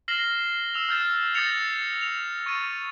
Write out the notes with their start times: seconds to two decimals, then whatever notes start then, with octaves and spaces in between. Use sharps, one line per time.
0.08 F6 A#6 C7 E7 F#7 G7
0.74 E6 E7 F7
0.89 F6 G6 A6 E7
1.35 D#6 G6 A6 A#6 C#7 F7
2.01 F7
2.46 C#6 A6 D#7